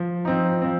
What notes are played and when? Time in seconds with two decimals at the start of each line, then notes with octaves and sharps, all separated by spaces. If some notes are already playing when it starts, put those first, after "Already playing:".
Already playing: F3
0.25 F3 C4 D#4
0.62 F3 C4